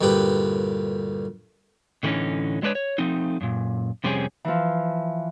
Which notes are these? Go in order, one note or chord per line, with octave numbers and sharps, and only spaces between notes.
D2 G2 A#2 G4 B4 B5
A2 D3 E3 F#3 C#4 D#4
F#3 G#3 D4 B4 C#5
C#5
F3 A3 C4 D#4
F#2 A#2
F2 C3 G3 C4 C#4 G#4
E3 F3